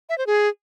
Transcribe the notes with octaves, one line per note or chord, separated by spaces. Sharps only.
E5
C5
G#4